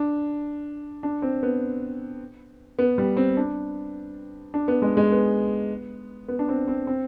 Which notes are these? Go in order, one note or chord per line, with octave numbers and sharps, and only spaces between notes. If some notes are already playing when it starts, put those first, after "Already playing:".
Already playing: D4
D4
C4
B3
B3
G3
C4
D4
D4
B3
G#3
G#3
B3
B3
D4
C4
C4
C4